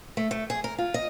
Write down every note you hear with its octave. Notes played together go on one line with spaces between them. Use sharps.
A3
A3
G#4
A#4
F4
D#5